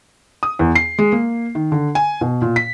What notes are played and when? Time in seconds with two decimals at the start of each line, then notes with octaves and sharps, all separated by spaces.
0.43 D#6
0.59 E2
0.75 C7
0.99 G#3
1.12 A#3
1.55 D#3
1.72 D3
1.95 G#5
2.21 B2
2.42 A#2
2.56 B6